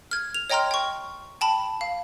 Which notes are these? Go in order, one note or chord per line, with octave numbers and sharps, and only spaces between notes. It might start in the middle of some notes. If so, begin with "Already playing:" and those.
F6 G#6
F7
C#5 D#5 G5 A#5 C6 F6
G5 C#6
G5 A5 B5
F5